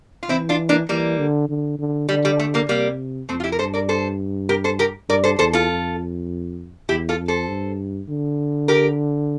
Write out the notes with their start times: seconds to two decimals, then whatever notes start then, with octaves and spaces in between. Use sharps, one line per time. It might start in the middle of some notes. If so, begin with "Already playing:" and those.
0.23 F4
0.29 E3 C4 E4
0.49 D4 F4
0.69 A#3 D4
0.89 E3 G3 A#3
1.19 D3
1.49 D3
1.79 D3
2.09 D3 G3
2.25 G3
2.39 A3
2.54 G3 A#3
2.69 C3 G3 A#3
3.29 F2 A3 C4
3.40 F4
3.44 E4 G4
3.52 A#4
3.59 G2 A4 C5
3.74 A#4 D5
3.89 A4 C5
4.49 G4 A#4
4.64 A4 C5
4.79 G4 A#4
5.09 G2 A#4 D5
5.24 A4 C5
5.39 E2 A4 C5
5.53 F4 A4
5.69 F2
6.89 E2 E4 G4
7.09 F4 A4
7.19 F2
7.28 A4 C5
7.48 G2
8.09 D3
8.68 G4 A#4